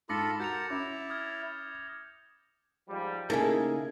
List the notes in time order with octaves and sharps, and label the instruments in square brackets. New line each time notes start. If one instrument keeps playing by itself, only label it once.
[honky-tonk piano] G#2 [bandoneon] F4 A4 B5 [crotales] D6 A#6 C#7
[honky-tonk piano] F#4 [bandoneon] A#4 F#5 [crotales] G6 A6 F7
[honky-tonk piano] C#4 [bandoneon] E4 [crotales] D6
[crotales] D#6 F6 G#6
[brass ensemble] G#2 F3 G3
[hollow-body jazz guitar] C#3 E4 A4 [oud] A#3 [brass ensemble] D#4 G#4